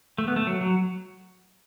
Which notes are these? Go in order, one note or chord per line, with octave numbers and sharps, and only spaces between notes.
A3
B3
A3
F#3
F#3